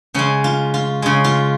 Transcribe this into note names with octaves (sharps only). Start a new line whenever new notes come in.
C#3 G#3 C#4
F4
F4
C#3 G#3
F4